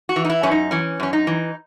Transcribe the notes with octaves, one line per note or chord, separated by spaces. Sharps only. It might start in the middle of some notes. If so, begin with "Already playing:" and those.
F#4
E3
D#4
E4
F#2 C#4
D#4
E3 C#4
F#2 C#4
D#4
E3